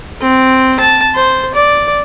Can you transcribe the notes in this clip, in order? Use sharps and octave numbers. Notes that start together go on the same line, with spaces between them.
C4
A5
C5
D5